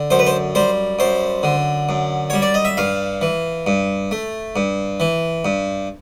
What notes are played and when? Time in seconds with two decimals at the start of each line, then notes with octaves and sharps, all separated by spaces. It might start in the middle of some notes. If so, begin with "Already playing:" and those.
Already playing: D3
0.10 F#2 C5
0.19 B4
0.26 C5
0.55 G3 C5
0.99 F#2 C5
1.43 D3
1.89 F#2
2.30 G3 C#5
2.42 D5
2.54 D#5
2.65 E5
2.77 G2 F5
3.21 E3
3.67 G2
4.11 A3
4.56 G2
5.00 E3
5.45 G2